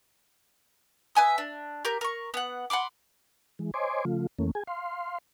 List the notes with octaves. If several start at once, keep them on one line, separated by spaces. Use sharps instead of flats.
B4 E5 G#5 D#6
D4
G4 A#4 G6
A#4 C#6
B3 F#5
F#5 B5 C6 D6
E3 G#3
C5 C#5 D#5 G#5 C6 D6
C#3 F3 A3 F4
F2 E3 A3 A#3 C#4
G#4 G#5
F5 C6